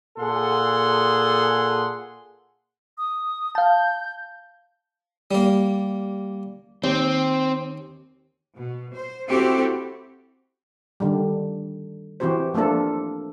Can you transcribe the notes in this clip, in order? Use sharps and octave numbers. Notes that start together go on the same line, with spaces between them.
A#2 G#4 A4 F#5 C6
D#6
F5 A5 G6
G3 A#3
D#2 C4
B2
C5
C4 E4 F#4 G4 A4
D3 D#3 G3
E3 C4 F#4 G4 C5
F3 A3 A#3 D4 A4